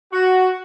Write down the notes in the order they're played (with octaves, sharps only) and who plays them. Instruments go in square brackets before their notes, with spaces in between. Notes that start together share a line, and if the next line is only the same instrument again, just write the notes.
[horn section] F#4